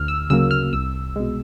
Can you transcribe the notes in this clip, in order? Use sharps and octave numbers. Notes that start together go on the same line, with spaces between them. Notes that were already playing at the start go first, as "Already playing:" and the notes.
Already playing: D2 F6
E6
C#3 F#3 A#3 E6
F6
C2 E6
B2 G#3